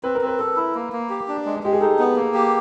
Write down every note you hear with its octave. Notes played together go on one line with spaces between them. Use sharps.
C4 B4
A#4
C4
B4
A4 B4
E4
A#3
A#3
G4
D4
G#3
G#3 G4
G#4
D#4 A4
B3
A#3
G4